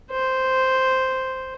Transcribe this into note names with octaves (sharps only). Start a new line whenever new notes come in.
C5